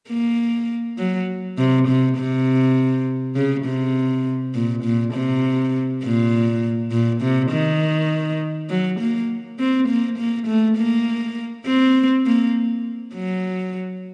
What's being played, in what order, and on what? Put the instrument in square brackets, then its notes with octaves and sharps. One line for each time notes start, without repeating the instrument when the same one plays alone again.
[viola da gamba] A#3
F#3
C3
C3
C3
C#3
C3
A#2
A#2
C3
A#2
A#2
C3
D#3
F#3
A#3
C4
A#3
A#3
A3
A#3
C4
A#3
F#3